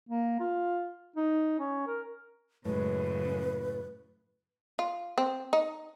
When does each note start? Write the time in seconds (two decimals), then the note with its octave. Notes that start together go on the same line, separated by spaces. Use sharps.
0.09 A#3
0.40 F4
1.16 D#4
1.59 C#4
1.87 A#4
2.65 F#2 A2 C#3 G#3 B4
4.79 F4
5.18 C4
5.53 D#4